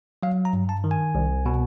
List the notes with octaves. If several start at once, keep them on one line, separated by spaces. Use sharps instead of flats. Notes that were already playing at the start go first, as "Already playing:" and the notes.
F#3 F5
A#5
G2
A5
D#3
G#5
C2
B2